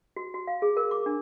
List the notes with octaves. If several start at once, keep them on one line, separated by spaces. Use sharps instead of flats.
F#4
F#4
F5
G#4
A#4
D6
D4